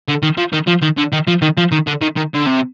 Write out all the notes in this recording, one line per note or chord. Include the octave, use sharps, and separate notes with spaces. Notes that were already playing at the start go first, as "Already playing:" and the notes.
D3
D#3
F3
D#3
F3
D#3
D3
D#3
F3
D#3
F3
D#3
D3
D#3
D#3
D3
C3